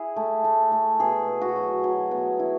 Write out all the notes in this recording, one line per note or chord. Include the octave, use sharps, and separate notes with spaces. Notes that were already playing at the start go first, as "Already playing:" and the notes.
Already playing: E4 G#4
A3
A3
A3
B2 G#4
B3
F#4
F#3
F#3
B3
E4